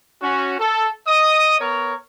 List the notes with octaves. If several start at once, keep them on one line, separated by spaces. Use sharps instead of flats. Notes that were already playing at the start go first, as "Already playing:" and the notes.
C#4 F#4
A4
D#5 D#6
B3 A#4 C#5